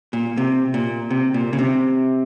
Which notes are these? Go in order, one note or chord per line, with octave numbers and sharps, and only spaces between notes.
A#2
C3
A#2
C3
A#2
C#3
C3